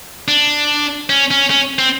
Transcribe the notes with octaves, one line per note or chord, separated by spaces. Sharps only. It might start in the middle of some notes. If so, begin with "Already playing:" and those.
D4
C#4
C#4
C#4
C4